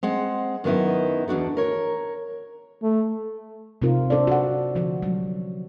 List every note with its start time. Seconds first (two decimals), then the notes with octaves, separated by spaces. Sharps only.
0.03 G#3 C4 F#5
0.64 F#2 D#3 B3 D#4 E4
1.28 E2 D4 F#4 A4
1.57 A#4 C#5
2.82 A3
3.82 C3 C4 D#4 F4 A#4
4.10 D4 A4 C5 D5
4.27 F#4 F#5
4.75 D3 F3 F#4
5.02 F#3 G3